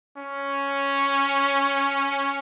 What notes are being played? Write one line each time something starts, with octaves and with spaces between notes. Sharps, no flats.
C#4